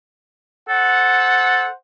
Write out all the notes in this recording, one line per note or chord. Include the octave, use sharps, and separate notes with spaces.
A4 C5 F#5